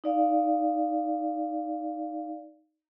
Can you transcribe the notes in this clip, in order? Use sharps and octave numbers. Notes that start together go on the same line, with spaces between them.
D#4 D5 F5